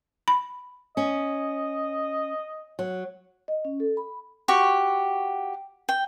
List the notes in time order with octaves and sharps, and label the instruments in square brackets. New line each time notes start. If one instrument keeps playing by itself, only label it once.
[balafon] B5
[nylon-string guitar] C#4 [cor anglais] D#5
[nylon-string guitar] F#3
[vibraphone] D#5
C#4
A4
B5
[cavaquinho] F#4 G4 C#6
G5